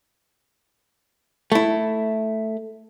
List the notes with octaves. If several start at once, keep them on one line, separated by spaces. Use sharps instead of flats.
A3 E4